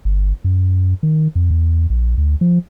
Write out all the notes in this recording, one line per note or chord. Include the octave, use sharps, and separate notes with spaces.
G1
F#2
D#3
F2
E2
A#1
D2
F3